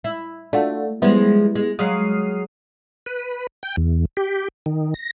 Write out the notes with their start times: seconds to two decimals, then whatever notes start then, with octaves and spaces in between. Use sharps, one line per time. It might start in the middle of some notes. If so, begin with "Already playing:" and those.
0.04 E4
0.53 A3 D4 F4 F#4
1.02 F3 G3 G#3 B3 E4
1.55 G#3
1.79 F#3 G#3 F5 D#6 F6 C7
3.06 B4
3.63 G5
3.77 E2
4.17 G4
4.66 D#3
4.94 A#6